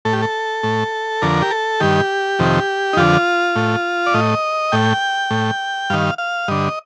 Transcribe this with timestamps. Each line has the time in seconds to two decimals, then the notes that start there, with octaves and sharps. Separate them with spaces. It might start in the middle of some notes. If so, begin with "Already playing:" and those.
0.05 A2 A4
0.13 G4
0.22 A4
0.63 A2
1.22 F2 D3 A#4
1.42 G4
1.51 A4
1.80 G2 D#3 G4
2.39 F2 C3 D#3
2.93 D#4
2.97 F2 D3 F4
3.56 A2
4.06 D5
4.14 A2 D#5
4.72 A2 G5
5.31 A2
5.90 G2 D#3 F5
6.18 F5
6.48 G2 D3 D#5